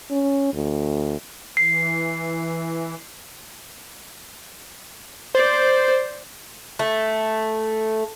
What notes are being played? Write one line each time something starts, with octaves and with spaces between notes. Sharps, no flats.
C#4
D2
E3 C7
C5 D5
A3